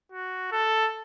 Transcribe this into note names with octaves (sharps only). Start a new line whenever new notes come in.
F#4
A4